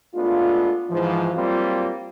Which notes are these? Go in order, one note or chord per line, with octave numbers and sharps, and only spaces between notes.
G#3 A3 B3 D4 F4
G#2 E3 F3
F#3 G3 A#3 C4 F4